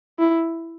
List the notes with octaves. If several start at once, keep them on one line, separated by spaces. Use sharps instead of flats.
E4